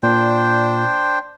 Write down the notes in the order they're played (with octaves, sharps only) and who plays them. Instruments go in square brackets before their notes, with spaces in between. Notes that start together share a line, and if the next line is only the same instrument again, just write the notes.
[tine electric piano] A#2 [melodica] D4 C5 G5